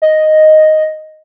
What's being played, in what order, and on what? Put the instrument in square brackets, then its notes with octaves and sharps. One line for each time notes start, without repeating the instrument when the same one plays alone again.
[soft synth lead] D#5